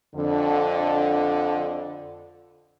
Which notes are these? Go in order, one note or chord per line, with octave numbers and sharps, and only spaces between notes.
F2 D3